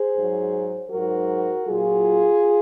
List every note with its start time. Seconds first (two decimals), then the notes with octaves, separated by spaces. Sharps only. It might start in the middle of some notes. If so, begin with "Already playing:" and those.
Already playing: G#4 C5
0.15 G#2 F#3
0.89 G#2 F#3 F#4 A#4
1.66 A#2 F#3 F4 G#4